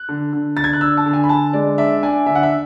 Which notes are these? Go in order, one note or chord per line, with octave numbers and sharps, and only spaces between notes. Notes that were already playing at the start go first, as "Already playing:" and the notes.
Already playing: F#6
D3
D3
D3 A6
G#6
F#6
D4 E6
A5
D3
G#5
B5
D3 A5
G#3 D5
D4 E5
D4 G#5
D3 E5
F#5
E5